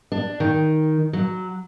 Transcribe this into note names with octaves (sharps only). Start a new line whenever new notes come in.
D4
D#3
F#3